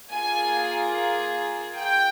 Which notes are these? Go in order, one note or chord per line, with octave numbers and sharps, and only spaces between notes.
A#3 F4 G#4 G#5
G5